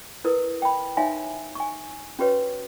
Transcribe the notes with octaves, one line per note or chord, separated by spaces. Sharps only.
E4 A#4 B4 D#6
G5 B5
D#4 C#5 E5 F5 G#5 C6
G#5 C#6
C#4 F#4 G4 B4 C#5